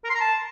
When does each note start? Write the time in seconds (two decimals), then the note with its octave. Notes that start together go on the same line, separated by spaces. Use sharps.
0.04 A#4
0.10 C6
0.15 A#5
0.21 A5